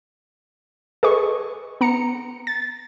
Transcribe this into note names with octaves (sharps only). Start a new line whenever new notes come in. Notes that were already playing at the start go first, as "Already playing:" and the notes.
G#4 A4 B4 D#5 C#6
B3 A#5 C#7
A6